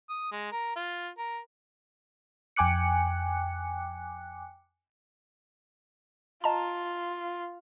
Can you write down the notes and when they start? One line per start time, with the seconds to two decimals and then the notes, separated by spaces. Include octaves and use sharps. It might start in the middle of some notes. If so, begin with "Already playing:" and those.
0.09 D#6
0.32 G#3
0.52 A#4
0.76 F4
1.18 A#4
2.56 F2 G5 G#5 D6 F#6 C#7
6.44 F4 D#5 A5 A#5